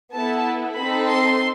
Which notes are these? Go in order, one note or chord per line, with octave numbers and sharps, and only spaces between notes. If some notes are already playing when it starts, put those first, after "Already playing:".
B3 E4 A4 A5
C4 D#4 A4 B5
C6